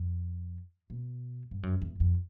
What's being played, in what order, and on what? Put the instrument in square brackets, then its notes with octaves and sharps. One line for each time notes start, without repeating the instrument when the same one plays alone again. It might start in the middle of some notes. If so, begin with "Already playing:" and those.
Already playing: [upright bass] F2
B2
G2
F#2
E2
F2